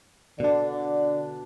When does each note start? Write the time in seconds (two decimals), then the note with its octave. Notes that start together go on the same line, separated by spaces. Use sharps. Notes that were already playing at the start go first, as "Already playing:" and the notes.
0.40 B2 D3 D4 D5